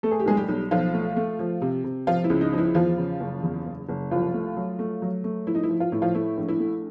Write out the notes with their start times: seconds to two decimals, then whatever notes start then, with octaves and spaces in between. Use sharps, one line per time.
0.03 A3 A4
0.11 G#4
0.20 G4
0.25 B1 G#3 G#4
0.37 G3 G4
0.48 B1
0.71 B1 F3 F4
0.94 A3
1.17 A3
1.39 F3
1.62 C3
1.84 C3
2.07 F3 F4
2.24 E4
2.30 C#2
2.41 D#4
2.52 F3 D#4
2.58 E4
2.75 E2 F3 F4
2.98 C#3
3.20 F#1
3.43 E2
3.65 F#1
3.89 F#1
4.11 C2 F3 F4
4.34 A3
4.56 F#3
4.79 A3
5.02 F#3
5.24 A3
5.47 F3 E4
5.55 D#4
5.63 E4
5.69 F3
5.80 F4
5.92 A2 E4
6.02 F3 F4
6.15 A3 E4
6.37 A#1
6.48 E4
6.60 A3